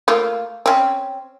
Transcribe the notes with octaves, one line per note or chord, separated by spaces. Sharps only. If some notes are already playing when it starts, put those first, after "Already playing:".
A3 A#3 F4
C4 C#4